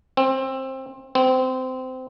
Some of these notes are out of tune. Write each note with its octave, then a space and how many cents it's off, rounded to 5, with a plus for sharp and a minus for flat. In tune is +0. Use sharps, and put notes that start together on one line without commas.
C4 +20
C4 -20